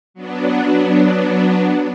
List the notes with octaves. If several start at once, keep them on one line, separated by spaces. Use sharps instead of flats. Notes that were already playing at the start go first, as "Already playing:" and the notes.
F#3 B3 D4